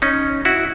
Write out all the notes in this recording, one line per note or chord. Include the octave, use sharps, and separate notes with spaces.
C#4 D#4
E4 F#4